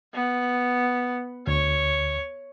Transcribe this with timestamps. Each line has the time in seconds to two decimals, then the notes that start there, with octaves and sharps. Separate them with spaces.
0.14 B3
1.47 D2 C#5